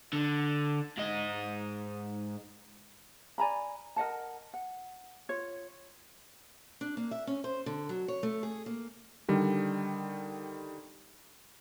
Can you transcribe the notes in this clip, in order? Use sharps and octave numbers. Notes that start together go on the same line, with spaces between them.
D3
G#2 D#5
D5 G#5 A#5 B5
A#4 D#5 F#5 A5
F#5
F4 C#5
D4
A#3
E5
C#4
C5
D3
F#3
C#5
A3
G#4
A#3
D3 D#3 G3